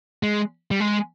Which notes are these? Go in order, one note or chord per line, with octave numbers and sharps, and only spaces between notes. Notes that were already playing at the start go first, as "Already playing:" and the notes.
G#3
G3
G#3